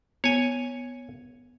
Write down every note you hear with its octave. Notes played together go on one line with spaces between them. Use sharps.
B3 C#5 G#5